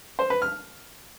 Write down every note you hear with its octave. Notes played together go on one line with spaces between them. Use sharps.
C5
B4
F6